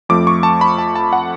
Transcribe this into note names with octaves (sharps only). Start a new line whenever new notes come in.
F2 F3 A3 D6
C#6
A5
B5
A5
A5
F#5